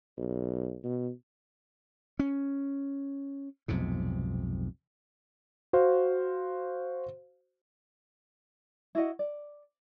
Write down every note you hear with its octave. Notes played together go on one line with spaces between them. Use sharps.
B1
B2
C#4
B1 F2 G#2 C3
F#4 C5 F5
E4 F#4 D#5 F#5
D5